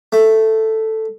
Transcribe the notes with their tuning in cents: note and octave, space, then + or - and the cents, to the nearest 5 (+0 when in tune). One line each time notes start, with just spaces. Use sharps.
A3 +5